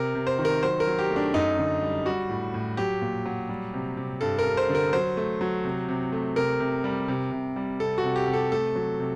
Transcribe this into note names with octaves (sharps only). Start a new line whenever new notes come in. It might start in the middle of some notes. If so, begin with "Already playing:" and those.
Already playing: C3 A#4
C3
C5
D#3
A#4
F#3 C5
A#4
F#3
G4
A3
D4
F#2 D#4
D3
G3
G3 F#4
A2
A2
F#3 G4
A#2
F#3
G3
C3
C3
G2 A4
A#4
G2
C5
D3
A#4
F#3 C5
A3
F#3
C3
C3
A3
C3 A#4
C3
G3
C3
C3
G3
C3 A4
F#4
C3
G4
C3
A4
A3 A4
F#3
C3